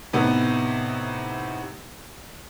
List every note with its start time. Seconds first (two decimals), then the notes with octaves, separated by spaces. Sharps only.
0.13 A2 C3 B3 D#4